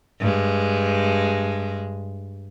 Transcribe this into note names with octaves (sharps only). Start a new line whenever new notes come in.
G2 G#3